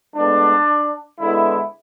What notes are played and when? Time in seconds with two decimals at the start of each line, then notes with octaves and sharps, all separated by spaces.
0.15 A2 G#3 B3 D4
1.19 D3 G#3 B3 E4